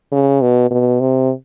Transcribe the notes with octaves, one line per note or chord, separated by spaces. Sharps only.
C#3
B2
B2
C3